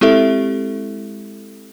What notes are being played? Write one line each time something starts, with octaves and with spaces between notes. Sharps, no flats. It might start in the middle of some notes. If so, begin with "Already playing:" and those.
G#3 C4 E4 G4 A4 E5